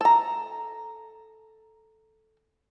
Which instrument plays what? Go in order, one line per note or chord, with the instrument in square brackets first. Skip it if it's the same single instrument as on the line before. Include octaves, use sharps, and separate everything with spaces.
[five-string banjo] A4 A#5